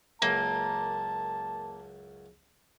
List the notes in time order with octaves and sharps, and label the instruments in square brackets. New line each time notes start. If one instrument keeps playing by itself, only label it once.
[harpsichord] C#2 F#2 [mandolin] A#3 [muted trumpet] A5